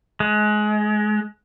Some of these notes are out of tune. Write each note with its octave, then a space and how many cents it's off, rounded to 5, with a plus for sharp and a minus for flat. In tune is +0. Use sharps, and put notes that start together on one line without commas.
G#3 +25